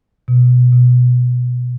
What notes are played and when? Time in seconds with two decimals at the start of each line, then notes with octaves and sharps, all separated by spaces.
0.28 B2
0.73 B2